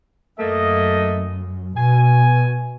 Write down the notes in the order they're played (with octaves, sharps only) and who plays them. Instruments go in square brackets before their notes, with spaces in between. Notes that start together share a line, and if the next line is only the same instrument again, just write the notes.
[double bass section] F#2 [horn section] A3 A#3 D#5
[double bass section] B2 [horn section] G#5